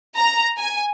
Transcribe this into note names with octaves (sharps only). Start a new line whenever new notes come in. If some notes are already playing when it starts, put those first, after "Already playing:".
A#5
G#5